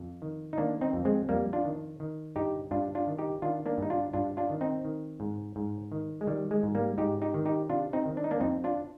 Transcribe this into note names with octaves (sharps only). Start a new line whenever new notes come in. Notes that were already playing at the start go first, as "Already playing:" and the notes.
Already playing: F2
D#3
D#4
D#3 A#3 D4
C4 D#4
F2
G#3 C4
F2 G3 A#3
D4 F4
D#3
D#3
G2 D#4 G4
G2 D4 F4
D4 F4
D#3
D#4 G4
D#3 D4 F4
A#3 D4
G2 D#4
D4 F4
G2 D4 F4
D4 F4
D#3
C4 D#4
D#3
G#2
G#2
D#3
G#3
D#3 G3
G#3
G#2
G3 A#3
G#2 D#4 G4
D#4 G4
D#3
D#4 G4
C3 D4 F4
C4 D#4
D#3
D4
D#4
A#3 D4
F2 C4 D#4
D4 F4